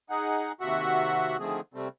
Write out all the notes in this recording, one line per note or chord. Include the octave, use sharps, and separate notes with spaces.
D#4 G#4 F#5
D#2 C3 F#4 E5 F#5
D3 D#3 F3 A3 C4 G#4
C3 G3 A3 C4